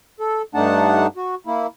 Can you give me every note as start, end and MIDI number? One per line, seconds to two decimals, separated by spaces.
0.20 0.42 69
0.55 1.07 43
0.55 1.07 57
0.55 1.07 62
0.55 1.07 63
0.55 1.07 78
0.55 1.07 81
1.17 1.35 66
1.47 1.67 58
1.47 1.67 64